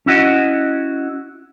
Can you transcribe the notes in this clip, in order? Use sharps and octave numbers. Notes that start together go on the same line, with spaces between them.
C#4 E4 F#4 D#5